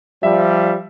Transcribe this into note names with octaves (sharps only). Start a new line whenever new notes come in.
F3 G3 E5